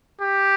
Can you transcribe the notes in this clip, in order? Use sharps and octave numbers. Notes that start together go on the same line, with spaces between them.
G4